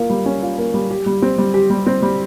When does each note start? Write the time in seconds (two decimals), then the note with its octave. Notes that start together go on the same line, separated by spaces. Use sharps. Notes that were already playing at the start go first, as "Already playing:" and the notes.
Already playing: A#3 F4
0.10 G3
0.26 C#4
0.42 F4
0.58 A#3
0.74 G3
0.90 G4
1.06 G3
1.22 C4
1.38 G3
1.54 G4
1.70 G3
1.86 C4
2.02 G3